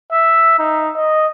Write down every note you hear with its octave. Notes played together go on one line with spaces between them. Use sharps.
E5
D#4
D#5